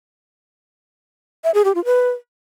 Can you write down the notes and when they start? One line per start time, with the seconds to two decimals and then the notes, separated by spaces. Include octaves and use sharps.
1.44 E5
1.54 G#4
1.65 G4
1.75 F4
1.85 B4